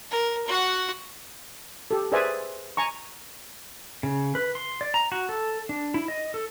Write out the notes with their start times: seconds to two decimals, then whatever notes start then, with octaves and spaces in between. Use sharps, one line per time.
0.11 A#4
0.48 F#4 F#5
1.91 G4 A4
2.12 G#4 B4 C5 D5 E5 G#5
2.77 G#5 A#5 C#6
4.03 C#3
4.35 B4
4.55 C6
4.81 D5
4.94 A#5
5.12 F#4
5.29 A4
5.69 D4
5.94 E4
6.08 D#5
6.34 A4